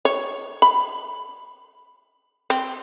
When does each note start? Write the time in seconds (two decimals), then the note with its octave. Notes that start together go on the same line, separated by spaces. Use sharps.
0.05 C#5
0.62 B5
2.50 C4